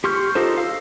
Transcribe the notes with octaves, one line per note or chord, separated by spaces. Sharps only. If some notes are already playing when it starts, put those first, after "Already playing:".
G4 C6 C#6 F6 G6
D#4 F4 G4 A4 C5
F5 E6